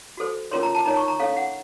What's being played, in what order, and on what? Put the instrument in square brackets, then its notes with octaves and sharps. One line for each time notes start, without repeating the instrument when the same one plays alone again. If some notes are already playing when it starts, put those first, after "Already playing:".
[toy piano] F#4 A4 C5
C#4 F4 A#4 C#5 C6
A#5
A5
D#4 A#4 C#5 A#5
C#6
A#5
C#4 A4 C#5 F5
F#5